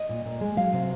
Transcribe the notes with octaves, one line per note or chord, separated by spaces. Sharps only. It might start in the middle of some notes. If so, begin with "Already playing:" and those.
Already playing: D#5
A#2
A#2
G#3
F#3 F5
C3